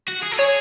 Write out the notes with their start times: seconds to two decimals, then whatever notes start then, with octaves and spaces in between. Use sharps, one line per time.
0.08 F#4
0.23 G#4
0.32 A4
0.39 G#4 C#5